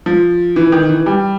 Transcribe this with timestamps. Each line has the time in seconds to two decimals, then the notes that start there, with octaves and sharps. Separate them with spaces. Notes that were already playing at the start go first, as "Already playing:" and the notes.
0.06 F3
0.56 E3
0.72 D#3
0.89 E3
1.06 G3